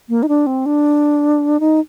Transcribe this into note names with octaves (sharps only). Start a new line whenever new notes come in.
A#3
D#4
D4
C4
D4
D#4